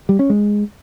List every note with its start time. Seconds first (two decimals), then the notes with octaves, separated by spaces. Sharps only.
0.09 G3
0.19 C#4
0.30 G#3